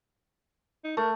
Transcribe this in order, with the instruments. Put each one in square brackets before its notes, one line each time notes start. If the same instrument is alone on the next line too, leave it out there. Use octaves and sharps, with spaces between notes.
[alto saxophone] D#4
[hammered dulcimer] A3 [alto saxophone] A#4